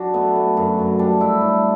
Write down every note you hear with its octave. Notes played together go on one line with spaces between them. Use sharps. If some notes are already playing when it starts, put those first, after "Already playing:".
Already playing: F#3 D4 F#4
A3 B3
A3
F#2
F#2
G3 D4
G3 E4
A2 D4